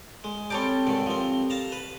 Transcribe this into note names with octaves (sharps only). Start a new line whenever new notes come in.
G#3
G3 C4 A4 C#5 D6
C2 G#2 D#3
F3 C4
F5 A5 A#5
B4